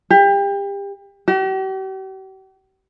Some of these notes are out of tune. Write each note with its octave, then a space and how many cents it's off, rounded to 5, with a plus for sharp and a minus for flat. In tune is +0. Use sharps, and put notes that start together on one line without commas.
G4 +30
G4 -45